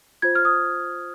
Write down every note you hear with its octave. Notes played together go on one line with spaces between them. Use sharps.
F4 C5 G#6
F6
D#6